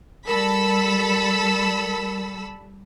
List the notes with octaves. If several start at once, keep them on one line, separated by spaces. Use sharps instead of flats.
G3 A4 A#4 B5 E6